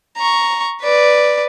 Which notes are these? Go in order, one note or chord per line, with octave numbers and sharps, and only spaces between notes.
A#5 C#6
B4 D5